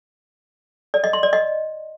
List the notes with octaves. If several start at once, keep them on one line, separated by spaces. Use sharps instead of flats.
D5
D#5
C6
D5
D#5